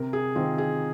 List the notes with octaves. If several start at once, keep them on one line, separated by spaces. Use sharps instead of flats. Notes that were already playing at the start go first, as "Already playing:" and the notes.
Already playing: C3 A#4
G#4
D#3 C4 F4
G#4